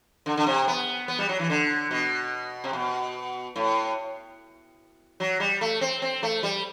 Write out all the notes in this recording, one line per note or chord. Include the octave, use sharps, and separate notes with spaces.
D3
D3
C3
B3
B3
G3
F#3
E3
D3
B2
C3
B2
A2
F#3
G3
A3
C4
C4
A3
G3